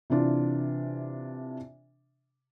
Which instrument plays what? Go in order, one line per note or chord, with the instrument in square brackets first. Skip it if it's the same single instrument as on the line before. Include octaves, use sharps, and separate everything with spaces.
[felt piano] C3 E3 D4 F4